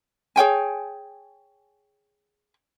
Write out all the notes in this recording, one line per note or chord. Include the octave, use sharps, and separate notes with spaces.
G#4 C#5 G5 G#5